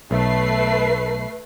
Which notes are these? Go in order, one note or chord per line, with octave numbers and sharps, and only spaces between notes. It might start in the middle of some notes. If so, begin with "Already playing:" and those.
B1 A3 B4 C7